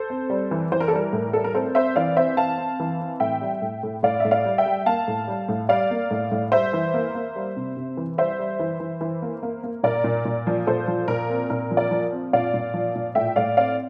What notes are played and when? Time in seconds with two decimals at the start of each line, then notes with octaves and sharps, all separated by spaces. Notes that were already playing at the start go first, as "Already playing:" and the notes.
Already playing: A4 C5
0.10 C4
0.30 G3
0.51 E3
0.72 E3 C5
0.80 A#4
0.88 A4
0.92 G3 A#4
1.13 A2
1.33 G3 A4
1.44 A#4
1.54 C4 A4 C5
1.75 C4 C5 E5
1.96 E3 D5 F5
2.17 C4 C5 E5
2.37 C4 F5 A5
2.58 C4
2.80 E3
3.00 C4
3.20 A2 E5 G5
3.41 G3
3.62 A2
3.83 A2
4.03 A2 D5 F5
4.20 A2 E5
4.31 D5 F5
4.45 G3
4.58 E5 G5
4.66 G3
4.86 A#3 F5 A5
5.08 A2
5.28 G3
5.49 A2
5.69 G3 D5 F5
5.91 A#3
6.11 A2
6.32 A2
6.52 G3 C5 E5
6.73 E3
6.94 A#3
7.14 A#3
7.36 G3
7.57 C3
7.77 C3
7.97 E3
8.18 G3 C5 E5
8.39 G3
8.59 E3
8.80 E3
9.01 E3
9.22 A#3
9.43 A#3
9.63 A#3
9.83 A#2 A#4 D5
10.04 A#2
10.25 A#2
10.47 F3
10.67 A#2 A4 C5
10.88 F3
11.08 A#2 A#4
11.30 C4
11.50 A#2 A#4
11.71 F3
11.77 A#4 D5
11.91 F3
12.12 C4
12.33 A#2 D5 F5
12.54 A#2
12.74 F3
12.96 A#2
13.15 A2 E5 G5
13.36 A2 D5 F5
13.57 C4 D5 F5